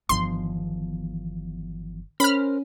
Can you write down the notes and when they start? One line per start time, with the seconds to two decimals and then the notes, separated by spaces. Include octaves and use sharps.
0.09 G1 E2 D#3 F3 C6
2.20 C#4 A#4 C5 B5 F6